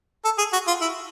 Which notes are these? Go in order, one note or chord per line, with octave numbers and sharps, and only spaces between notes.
A4
G#4
F#4
F4
E4